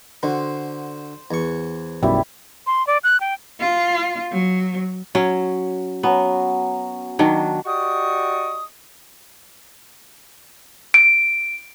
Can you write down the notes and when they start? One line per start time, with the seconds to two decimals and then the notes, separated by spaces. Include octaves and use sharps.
0.23 D3 F#4 C5
1.31 E2 C#6
2.03 B1 F#2 G3 E4
2.67 C6
2.87 D5
3.04 F#6
3.20 G5
3.60 F4
4.32 F#3
5.15 F#3 C#4
6.03 F#3 B3 C#4
7.19 D#3 F#3 D4
7.66 F#4 G4 D5 D#5 C#6 D#6
10.94 D7